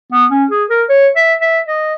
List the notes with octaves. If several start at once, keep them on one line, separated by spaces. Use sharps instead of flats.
B3
C#4
G#4
A#4
C#5
E5
E5
D#5